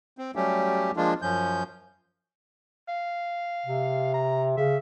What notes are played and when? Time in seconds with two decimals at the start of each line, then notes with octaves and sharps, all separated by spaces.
0.18 C4
0.35 F#3 G3 A3 C#4 G4
0.97 F3 G#3 A#3 D4 F4
1.22 F#2 F3 C#4 G6
2.88 F5
3.66 C3
4.14 A#5
4.57 C#3 E5